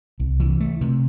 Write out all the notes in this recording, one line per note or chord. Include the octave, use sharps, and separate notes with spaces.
C2
E3
A3
C3